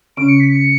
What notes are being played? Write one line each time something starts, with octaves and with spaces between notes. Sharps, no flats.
C#3 C#4 D7
C#7
B6
C#7